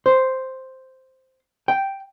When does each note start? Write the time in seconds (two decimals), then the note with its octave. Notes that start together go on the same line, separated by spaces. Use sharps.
0.06 C5
1.68 G5